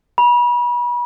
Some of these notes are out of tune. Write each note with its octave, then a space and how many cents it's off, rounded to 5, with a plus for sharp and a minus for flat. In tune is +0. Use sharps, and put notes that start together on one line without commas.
B5 -35